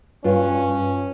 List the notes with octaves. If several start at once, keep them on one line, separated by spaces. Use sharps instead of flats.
G2 C#4 F4